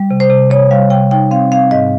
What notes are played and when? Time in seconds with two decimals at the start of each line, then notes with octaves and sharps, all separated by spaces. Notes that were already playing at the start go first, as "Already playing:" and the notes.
Already playing: G3
0.11 C3
0.20 C5
0.30 C3
0.51 C3 C#5
0.71 G3 F5
0.90 C3 G5
1.11 D#4 G5
1.31 C4 F5
1.52 C4 F5
1.71 G#2 D#5